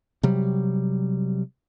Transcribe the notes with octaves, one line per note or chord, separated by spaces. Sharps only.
C3 F#3 G3